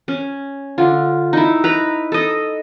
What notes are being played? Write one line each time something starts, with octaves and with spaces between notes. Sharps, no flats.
C#4
D3 F4
D#4 E4
B4 A#5 B5
A4 D#5